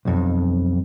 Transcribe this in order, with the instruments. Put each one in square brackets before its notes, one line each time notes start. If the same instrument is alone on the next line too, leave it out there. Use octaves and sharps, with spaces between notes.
[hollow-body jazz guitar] B1 F2